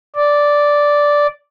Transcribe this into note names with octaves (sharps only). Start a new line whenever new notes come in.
D5